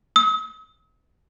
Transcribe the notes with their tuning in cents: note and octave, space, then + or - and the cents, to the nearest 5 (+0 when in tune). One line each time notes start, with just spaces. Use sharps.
D#6 +45